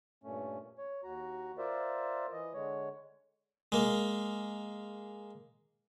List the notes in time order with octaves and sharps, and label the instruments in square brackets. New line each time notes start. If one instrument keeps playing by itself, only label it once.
[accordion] G2 A#2 A3 C#4
C#5
D#2 F#4 A#5
F4 A#4 C5 D5 E5
E3 D#5
D3 G#3 C#5
[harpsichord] G#3 A#3